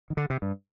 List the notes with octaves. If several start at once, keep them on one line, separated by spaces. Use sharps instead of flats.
D#3
D3
C3
G2